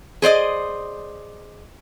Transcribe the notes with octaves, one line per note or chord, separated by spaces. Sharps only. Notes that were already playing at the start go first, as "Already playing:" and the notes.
G#4 C5 D5 D#5